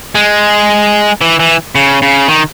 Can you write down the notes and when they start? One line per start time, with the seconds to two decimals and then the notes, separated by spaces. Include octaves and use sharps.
0.15 G#3
1.21 E3
1.40 E3
1.75 C#3
2.02 C#3
2.28 D#3